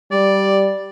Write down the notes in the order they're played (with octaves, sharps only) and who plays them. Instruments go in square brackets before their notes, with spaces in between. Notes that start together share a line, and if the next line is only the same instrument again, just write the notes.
[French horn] G3 [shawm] D5